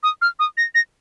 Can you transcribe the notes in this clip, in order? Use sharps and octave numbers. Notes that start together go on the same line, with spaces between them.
D#6
F6
D#6
A#6
A#6